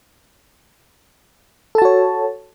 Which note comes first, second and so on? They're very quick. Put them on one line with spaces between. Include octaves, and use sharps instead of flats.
A4 A5 F#4 C#5